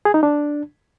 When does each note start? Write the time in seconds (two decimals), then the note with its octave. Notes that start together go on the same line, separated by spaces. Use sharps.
0.05 G#4
0.14 D#4
0.23 D4